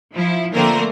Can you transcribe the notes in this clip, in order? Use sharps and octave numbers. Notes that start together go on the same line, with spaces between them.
F3 E4
D3 F3 A3 A#3 C4 A#4